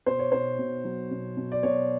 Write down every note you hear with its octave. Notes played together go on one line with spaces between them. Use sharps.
B2 C5
C#5
B2 C5
B2
F#3
B2
B2
D5
B2 C#5